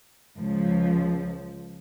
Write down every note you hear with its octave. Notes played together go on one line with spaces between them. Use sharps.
C#2 F3